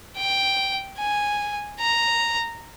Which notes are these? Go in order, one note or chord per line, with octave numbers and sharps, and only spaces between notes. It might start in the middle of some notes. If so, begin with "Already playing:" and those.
G5
G#5
A#5